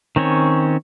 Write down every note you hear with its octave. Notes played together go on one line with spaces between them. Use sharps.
D#3 C4 C#4 C#5